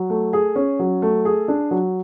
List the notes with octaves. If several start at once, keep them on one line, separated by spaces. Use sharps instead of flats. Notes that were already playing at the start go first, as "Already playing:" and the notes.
Already playing: F#3
A3
G#4
C#4
F#3
A3
G#4
D4
F#3